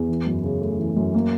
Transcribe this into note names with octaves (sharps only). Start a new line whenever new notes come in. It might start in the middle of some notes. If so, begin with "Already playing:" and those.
Already playing: E2
E3
F#2
C#3
A3
E3
F#2
A#3